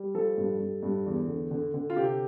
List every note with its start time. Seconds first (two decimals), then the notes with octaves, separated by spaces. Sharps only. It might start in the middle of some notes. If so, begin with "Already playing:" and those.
Already playing: G3
0.15 F3 A4
0.38 G2
0.60 G2
0.83 G2
1.06 E2
1.28 D3
1.51 D3
1.74 D3
1.90 F4
1.96 C3 G4